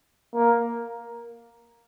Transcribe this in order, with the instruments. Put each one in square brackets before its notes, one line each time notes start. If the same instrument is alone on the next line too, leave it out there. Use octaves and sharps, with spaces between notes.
[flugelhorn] A#3